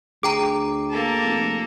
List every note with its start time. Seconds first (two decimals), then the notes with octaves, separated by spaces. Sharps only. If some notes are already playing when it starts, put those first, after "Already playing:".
0.23 D2 G#4 G5 A#5 D6
0.90 A#3 A4
1.23 F1